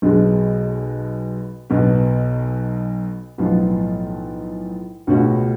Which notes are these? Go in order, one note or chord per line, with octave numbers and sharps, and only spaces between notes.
B1 B2 G#3
B1 B2 F#3 B3
B1 A2 F3 B3 F4
C#2 B2 A3 C#4 F#4